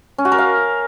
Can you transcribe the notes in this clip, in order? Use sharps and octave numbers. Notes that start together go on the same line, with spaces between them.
C#4
F#4
A#4
F5